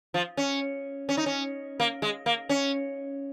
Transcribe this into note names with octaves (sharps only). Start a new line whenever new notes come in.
F3
C#4
C#4
D#4
C#4
A#3
G#3
A#3
C#4